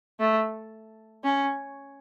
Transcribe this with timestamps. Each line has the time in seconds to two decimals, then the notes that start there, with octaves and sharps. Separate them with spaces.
0.20 A3
1.24 C#4